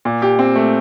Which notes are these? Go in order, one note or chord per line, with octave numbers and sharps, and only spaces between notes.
A#2
G4
C4
A3